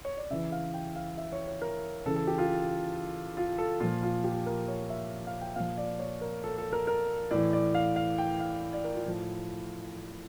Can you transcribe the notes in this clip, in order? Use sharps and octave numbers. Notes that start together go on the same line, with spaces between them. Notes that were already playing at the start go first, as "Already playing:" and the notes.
C#5
D5
C#3 E3 E5
F5
G5
F5
E5
C#5
C#5
A#4
C#3 E3 A4
A4
G4
F4
F4
A4
A#2 F3 F4
F4
G4
A#4
C#5
E5
F5
G5
A#2 F3 F5
D5
C#5
A#4
A4
A4
A#4
A#4
A2 E3 D5
D5
F5
F5
G5
F5
D5
A#4
F4
A2 F3